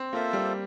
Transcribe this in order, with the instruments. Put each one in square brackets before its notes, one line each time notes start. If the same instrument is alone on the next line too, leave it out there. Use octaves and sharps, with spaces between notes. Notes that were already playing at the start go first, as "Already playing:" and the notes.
Already playing: [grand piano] C4
[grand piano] A#3 [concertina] F4 A4 C5 E5
[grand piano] G3